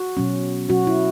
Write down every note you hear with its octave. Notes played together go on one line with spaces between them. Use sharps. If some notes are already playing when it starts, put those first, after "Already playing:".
Already playing: F#4
B2 F#3 C#4
B2 F#3 C#4 F#4
E4